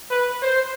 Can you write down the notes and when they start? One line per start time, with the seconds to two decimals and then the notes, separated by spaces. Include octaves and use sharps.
0.10 B4
0.42 C5